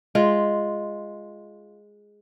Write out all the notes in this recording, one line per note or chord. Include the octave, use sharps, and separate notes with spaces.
G#3 F4